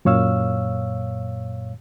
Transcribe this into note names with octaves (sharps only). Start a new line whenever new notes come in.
F#2 A#2 C#5 F5 E6